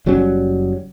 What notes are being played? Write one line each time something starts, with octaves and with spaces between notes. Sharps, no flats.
F#1 F#3 G3 C#4